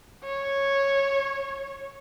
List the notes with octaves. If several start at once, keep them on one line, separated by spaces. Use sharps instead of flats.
C#5